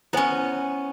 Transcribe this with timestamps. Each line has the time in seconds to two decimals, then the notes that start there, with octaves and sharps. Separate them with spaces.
0.13 B3 C#4 E4 C5 G#5